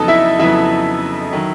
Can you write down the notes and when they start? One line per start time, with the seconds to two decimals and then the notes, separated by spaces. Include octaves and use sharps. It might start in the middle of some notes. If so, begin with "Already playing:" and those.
Already playing: F2 C#3 F#3 B3 D#4 A4 D#5 A5
0.08 E4 E5
0.39 F2 C#3 F#3 B3 E4 E5
1.33 D#3 F#3